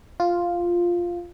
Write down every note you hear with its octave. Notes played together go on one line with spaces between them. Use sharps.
F4